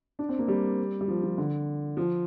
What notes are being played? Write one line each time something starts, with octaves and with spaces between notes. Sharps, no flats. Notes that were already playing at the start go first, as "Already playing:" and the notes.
D4
C4
A#3
G3
G3
F3
F3
D3
F3